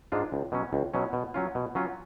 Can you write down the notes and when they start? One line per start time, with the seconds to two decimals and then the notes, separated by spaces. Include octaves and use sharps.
0.12 G#2 G#3 D4 F4
0.32 C#2
0.52 B2 F#3 C#4
0.73 C#2
0.94 B2 F#3 C#4
1.13 B2
1.34 F#3 C#4 F4
1.55 B2
1.75 F#3 C#4 F4